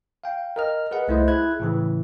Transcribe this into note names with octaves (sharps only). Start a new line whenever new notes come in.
F5 G5
A#4 D#5 F6
G#4 B4 D#5 F#5
C2 A3 E4 C5 D#5
E4 G#4 F#6 G#6
A2 C#3 E3